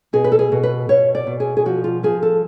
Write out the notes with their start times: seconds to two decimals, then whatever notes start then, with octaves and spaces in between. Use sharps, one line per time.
0.13 B2 G#4
0.24 B4
0.32 A4
0.39 G#4
0.52 B2
0.63 B4
0.89 B2 C#5
1.15 D5
1.27 B2
1.40 G#4
1.57 G#4
1.65 F3 F#4
1.84 F4
2.03 F3 G#4
2.23 A4